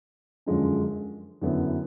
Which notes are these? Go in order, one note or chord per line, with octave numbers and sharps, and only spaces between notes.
F#2 D3 F3 G#3 C#4
F#2 D3 F#3 B3 E4